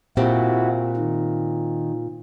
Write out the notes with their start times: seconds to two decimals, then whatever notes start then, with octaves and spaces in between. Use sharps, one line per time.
0.17 A#2 C4 E4 F#4 G4
0.97 D#3